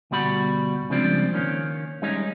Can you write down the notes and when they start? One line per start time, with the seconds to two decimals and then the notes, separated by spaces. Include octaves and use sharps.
0.11 D2 B2 G3 F#4 B5
0.90 C#3 F3 G3 G#3 C4 D4
1.33 D#3 A#3 C#4
2.02 G3 G#3 C#4 D#4 G#4